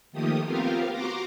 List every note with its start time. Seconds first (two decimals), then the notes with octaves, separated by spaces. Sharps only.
0.12 D#3 F3 A3 A#3 G4 D#6
0.44 B3 C4 F4 G4 A#4 F5
0.90 F#4 A#5 C6 D6